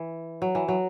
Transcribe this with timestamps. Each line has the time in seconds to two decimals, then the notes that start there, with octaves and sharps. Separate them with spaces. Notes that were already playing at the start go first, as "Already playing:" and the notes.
Already playing: E3
0.42 F#3
0.55 E3
0.68 F#3